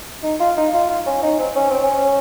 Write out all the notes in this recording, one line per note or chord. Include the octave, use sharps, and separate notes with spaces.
D#4
F4
D#4
F4
F4
C#4
D#4
C4
C#4
C4
C#4